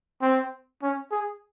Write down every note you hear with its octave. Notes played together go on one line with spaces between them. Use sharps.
C4
C#4
G#4